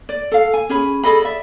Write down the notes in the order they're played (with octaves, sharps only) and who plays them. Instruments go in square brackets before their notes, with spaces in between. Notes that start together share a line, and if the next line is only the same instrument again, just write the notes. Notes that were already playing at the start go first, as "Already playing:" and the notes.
[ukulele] D5
A4 F5
G#5
C#4 G#4 B5
G#4 A4 D#5 B5
D5 E5